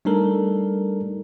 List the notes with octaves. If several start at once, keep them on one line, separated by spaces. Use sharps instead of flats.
G3 A3 D4 D#4 A4 A#4